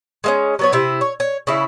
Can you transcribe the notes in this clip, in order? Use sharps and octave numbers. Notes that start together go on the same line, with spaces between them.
G#3 A#3 C#4
F#3 B3 C#5
C3 E4
C#5
C#5
C#3 E4